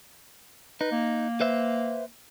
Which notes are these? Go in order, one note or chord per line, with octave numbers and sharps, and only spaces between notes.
D#4 B4
A#3
B4 C5 E5